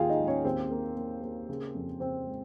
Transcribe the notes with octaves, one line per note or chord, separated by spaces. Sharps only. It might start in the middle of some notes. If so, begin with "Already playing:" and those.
Already playing: D#2 D#3 F4 G#4 F5 G5 G#5
D#4 D#5
G#3
C#4 C#5
D#2 C4 C5
A#3
A#3
A#3
C#3
F2
C#3 C4 C5
G#3